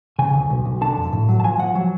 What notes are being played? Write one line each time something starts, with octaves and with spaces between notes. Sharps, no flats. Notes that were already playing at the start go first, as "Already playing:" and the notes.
C#3 G#5
D2
B1
B1
D3 A5
F2
A2
F#3
A5
F3 G#5
F3 F#5
F#3